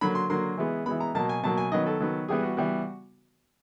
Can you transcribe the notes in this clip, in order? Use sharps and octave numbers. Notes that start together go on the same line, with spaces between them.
D3 F#3 A#3 B5
C6
D3 F#3 A#3 C6
E3 G#3 B3
E3 G#3 B3 B5
A#5
B2 F#3 A#3 A5
G#5
B2 F#3 A#3 A5
G#5
D#3 F#3 B3 D#5
A4
D#3 F#3 B3
E3 G3 B3 G#4
F#4
E3 G3 B3